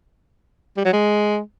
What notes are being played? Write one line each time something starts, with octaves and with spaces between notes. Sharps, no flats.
G3
F#3
G#3